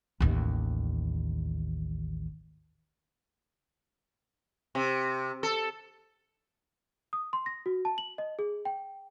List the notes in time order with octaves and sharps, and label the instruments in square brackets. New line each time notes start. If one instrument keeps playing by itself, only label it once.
[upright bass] A1 D#2
[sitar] C3
A4
[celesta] D#6
C6
A#6
F#4
A5
F#7
D#5
G#4
G5